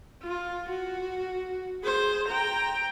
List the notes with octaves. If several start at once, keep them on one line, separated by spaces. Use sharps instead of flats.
F4
F#4
G#4 C5
G5 A#5